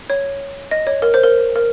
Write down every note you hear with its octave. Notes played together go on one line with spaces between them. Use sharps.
C#5
D#5
C#5
A#4
C5
A#4
A#4